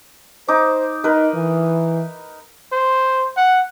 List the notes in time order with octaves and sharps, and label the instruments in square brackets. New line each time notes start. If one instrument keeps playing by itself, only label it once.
[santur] D#4 D6 [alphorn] C5
[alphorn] D#4 [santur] A#4 B4
[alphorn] E3
[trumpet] C5
F#5